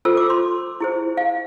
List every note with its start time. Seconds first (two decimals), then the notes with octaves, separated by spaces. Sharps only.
0.05 F4 A4 C5 E6
0.17 D6
0.30 C6
0.80 E4 G#4 C5
1.17 F5